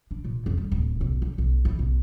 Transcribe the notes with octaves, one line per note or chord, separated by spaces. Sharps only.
D4
A#2
F2
G3
D1
B1
D3
B1
E3
B1